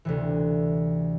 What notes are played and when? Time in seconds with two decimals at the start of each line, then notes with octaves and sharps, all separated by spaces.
0.05 D2 C3 E3